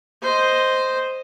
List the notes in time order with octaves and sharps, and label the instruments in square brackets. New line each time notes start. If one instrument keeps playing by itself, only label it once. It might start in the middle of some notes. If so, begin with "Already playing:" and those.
[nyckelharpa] C5 D#5